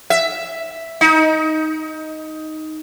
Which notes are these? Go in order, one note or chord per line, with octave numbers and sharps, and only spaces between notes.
E5
D#4